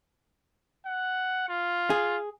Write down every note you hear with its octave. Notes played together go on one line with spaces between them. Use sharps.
F#5
F4
G#4